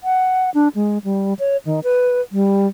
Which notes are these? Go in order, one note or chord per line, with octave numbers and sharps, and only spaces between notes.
F#5
D4
G#3
G3
C#5
D#3
B4
G3